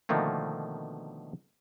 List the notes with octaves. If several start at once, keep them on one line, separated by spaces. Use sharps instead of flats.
B2 D3 D#3 F3 A3 A#3